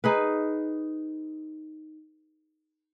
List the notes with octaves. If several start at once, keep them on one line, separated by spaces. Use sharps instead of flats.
D#4 G#4 B4